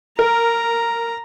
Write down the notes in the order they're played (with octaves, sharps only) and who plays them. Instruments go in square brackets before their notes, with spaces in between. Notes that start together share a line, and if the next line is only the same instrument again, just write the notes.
[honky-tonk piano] A#4 [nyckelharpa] A#5